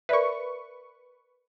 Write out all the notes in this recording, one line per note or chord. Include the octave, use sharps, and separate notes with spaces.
A#4 B4 D5 E5 C#6